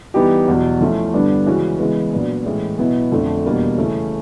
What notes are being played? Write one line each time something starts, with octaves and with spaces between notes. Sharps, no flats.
E3 G3 B3 D#4 G4
E2 B2 F#3
F3 A3 C#4 E4
G2 D3 G3 B3 D4
C#3 E3 G#3 C#4 F#4
C#3 E3 G#3 B3
A#2 F#3 B3 D4
A2 E3 G#3 C#4
B2 F#3 B3 E4
F2 D3 F3 A3
E2 B2 G3 A#3 D4
C#3 E3 A3 C#4